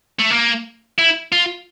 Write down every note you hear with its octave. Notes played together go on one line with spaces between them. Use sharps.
A3
A#3
E4
F4